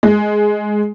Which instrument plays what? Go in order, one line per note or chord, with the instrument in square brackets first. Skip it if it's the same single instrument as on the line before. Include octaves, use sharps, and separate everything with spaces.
[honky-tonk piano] G#3